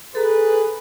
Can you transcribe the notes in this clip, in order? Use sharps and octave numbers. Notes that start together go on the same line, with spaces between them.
G#4 A4 B4 A#5